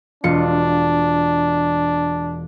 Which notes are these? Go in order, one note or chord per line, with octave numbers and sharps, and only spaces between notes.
E1 D4 F4 C#7